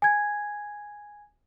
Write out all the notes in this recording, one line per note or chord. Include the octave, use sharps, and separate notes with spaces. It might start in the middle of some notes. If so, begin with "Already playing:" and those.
G#5 G#6